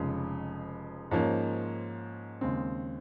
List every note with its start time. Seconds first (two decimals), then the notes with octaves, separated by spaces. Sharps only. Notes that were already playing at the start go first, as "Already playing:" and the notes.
Already playing: F1 F2 C#3 G#3
1.11 G#2 F3 A#3 C#4
2.41 D#2 C#3 G#3 C4